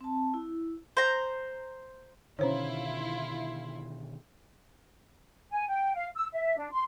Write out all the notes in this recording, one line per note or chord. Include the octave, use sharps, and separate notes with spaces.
C4 A5
E4
C5 A#5
B2 D3 D#3 C#4 E4 F4 C5 C#5
G#5
G5
F5
E6
E5
D4
C6